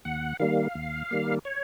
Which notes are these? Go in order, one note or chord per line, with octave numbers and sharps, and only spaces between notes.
D#2 F#5
D#3 G3 A#3 F5
D#2
D#3 G3 A#3
C#5